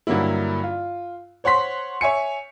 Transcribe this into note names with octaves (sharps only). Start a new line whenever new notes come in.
G2 D3 F#3 A#3 E4
F4
C5 C#5 F#5 C6 B6
C#5 E5 G#5 C#7